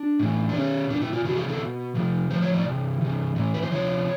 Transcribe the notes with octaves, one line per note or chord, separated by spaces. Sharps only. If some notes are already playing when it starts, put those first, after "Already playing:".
Already playing: D4
A2 E3
D4
B2 C#4
B2 D4
E4
F4
C3 E3 F#4
G#4
A4
B2
C3 F3
A2 F3 C5
C#5
D5
C3 E3
C3 E3
A2 E3
B4
C5
C3 F3 C#5